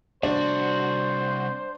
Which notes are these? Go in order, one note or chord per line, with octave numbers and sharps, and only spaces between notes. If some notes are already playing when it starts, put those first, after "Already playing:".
C2 D4 F#4 C5